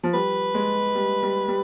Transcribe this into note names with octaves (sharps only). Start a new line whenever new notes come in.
F3
G3 B4
G#3
G3
G3
G3